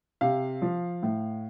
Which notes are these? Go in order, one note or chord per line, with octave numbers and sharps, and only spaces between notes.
C3 F5
F3
A2